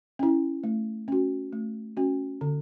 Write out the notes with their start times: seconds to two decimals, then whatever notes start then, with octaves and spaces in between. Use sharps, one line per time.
0.19 C#4 E4
0.64 A3
1.08 C#4 F#4
1.53 A3
1.97 C#4 F#4
2.41 D3